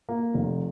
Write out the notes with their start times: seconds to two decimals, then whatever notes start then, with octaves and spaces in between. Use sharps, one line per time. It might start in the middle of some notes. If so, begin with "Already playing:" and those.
0.09 A#3
0.34 F1